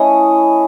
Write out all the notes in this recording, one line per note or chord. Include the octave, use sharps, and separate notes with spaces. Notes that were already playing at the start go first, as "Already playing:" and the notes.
Already playing: A3 C#4 E4 D#5